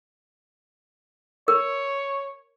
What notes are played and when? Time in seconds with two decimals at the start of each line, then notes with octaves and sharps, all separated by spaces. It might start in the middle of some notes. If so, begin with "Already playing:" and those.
1.48 A#4 C#5